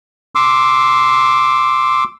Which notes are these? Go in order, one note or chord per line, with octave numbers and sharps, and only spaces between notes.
C6 D6 E6